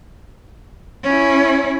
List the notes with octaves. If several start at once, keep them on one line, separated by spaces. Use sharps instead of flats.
C#4 E4